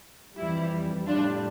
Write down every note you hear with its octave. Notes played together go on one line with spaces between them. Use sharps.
F2 E3 G3 E4
A2 G3 D4 F4